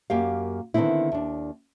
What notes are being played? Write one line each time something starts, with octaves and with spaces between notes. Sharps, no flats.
F#2 A#3 G4 F5
D3 D#3 A3 B3 C4 E4
D#2 D4